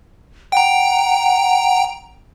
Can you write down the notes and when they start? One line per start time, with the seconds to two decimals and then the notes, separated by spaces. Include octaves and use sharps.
0.52 F#5 G5 A#5